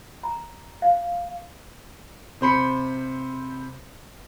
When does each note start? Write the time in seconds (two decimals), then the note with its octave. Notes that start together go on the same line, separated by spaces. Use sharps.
0.23 A#5
0.82 F5
2.41 C3 C5 B5 C#7